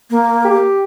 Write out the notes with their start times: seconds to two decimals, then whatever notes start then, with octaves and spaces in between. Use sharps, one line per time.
0.10 A#3
0.44 G4